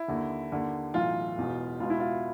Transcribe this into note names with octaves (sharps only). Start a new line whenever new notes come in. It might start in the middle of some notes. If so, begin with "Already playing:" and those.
Already playing: E4
D#2 D3
D#2 D3
B1 A2 E3 F4
E1 E2 B2
C#2 B2 F4
E4
F4